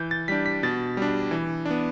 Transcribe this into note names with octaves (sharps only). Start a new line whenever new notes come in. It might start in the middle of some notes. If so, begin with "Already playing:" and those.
Already playing: E3 G6
A6
G3 D4 B6
B6
B2 A6
G3 D4
E3
D4
B3